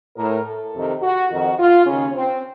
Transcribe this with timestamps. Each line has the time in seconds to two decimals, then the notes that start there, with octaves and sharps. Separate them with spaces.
0.17 A2 A#4
0.45 A4
0.73 F2 C3 D#3
1.02 F#4
1.30 F2 D#3 F#4
1.58 F4
1.85 D#2 C#3 C#4
2.14 C4